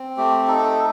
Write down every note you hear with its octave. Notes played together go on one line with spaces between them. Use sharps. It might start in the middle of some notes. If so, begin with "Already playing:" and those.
Already playing: C4
A3 G4
D#4 A4